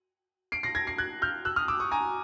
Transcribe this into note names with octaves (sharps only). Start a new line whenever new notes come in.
C7 D7
A#6 C7
G#6 A#6
A#6 C7
F#6 G#6
F6 G6
E6 F#6
D#6 F6
D6 E6
C#6 D#6
G#5 A#5